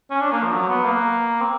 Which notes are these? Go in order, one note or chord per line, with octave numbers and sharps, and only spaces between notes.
C#4
D4
A#3
F3
F#3
B3
A#3
C4